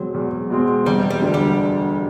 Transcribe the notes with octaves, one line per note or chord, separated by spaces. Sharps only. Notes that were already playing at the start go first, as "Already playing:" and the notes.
Already playing: E2 B2 F#3 G#3 C4
E2
B2 G#3 C4
E1 G3
G3
D2 D3
G3